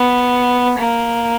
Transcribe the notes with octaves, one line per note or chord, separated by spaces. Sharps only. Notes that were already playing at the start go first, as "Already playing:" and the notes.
Already playing: B3
A#3